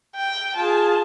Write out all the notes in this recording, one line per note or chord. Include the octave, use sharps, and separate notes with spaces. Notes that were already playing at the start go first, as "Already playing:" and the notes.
G5
F4 G#4 A5